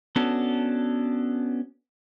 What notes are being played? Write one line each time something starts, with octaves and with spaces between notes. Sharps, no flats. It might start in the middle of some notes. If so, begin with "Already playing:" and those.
B3 C#4 D4 F#4 A4